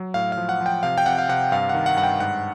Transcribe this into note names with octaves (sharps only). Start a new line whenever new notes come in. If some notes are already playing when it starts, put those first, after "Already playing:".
Already playing: F#3
A2 F5
F5
F3
F#5
F3
G5
C3 F5
G5
C3 F#5
F5
C3 F#5
G2 F5
D#3 F#5
F#5
G2 F#5
G5
G#2 F#5